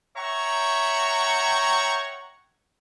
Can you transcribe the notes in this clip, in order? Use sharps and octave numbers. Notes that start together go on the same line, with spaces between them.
C#5 E5 F#5 G5 A#5 C#6